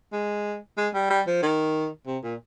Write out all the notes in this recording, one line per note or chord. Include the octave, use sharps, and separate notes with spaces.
G#3
G#3
G3
G3
F3
D#3
C3
A#2